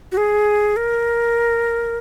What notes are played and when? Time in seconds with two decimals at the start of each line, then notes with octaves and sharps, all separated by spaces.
0.12 F#4
0.17 G#4
0.76 A#4